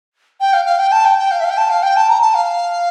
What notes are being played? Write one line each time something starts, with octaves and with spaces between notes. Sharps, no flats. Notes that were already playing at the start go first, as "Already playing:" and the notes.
G5
F5
F5
G5
A5
G5
G5
F5
E5
F5
G5
A5
F5
G5
A5
A#5
A5
F5